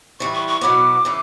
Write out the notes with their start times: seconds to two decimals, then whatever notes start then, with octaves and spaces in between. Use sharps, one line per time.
0.20 E3 G3 B3 C#6
0.34 C#6
0.48 C#6
0.61 B2 F#3 B3 D6
1.05 C#3 E3